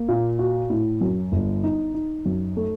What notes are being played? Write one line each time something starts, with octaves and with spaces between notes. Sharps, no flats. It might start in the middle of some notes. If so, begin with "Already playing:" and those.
Already playing: A#3
A#2
F#4
A2
F#2
G1
D#4
D#4
F#2
A3